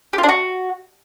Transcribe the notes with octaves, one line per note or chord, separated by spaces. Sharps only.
G4
F4
D4
F#4